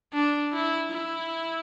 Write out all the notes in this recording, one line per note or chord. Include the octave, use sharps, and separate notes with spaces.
D4
E4
E4